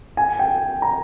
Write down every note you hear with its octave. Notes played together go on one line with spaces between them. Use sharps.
G#5
G5
A#5